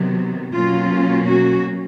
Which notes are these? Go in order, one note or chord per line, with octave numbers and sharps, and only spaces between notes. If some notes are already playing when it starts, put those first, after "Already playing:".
Already playing: C3 D#3 F#3 B3
B2 F#3 A#3 C#4 F4
F#4